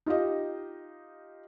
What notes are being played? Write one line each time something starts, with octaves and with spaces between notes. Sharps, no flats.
D#4 F4 G4 D#5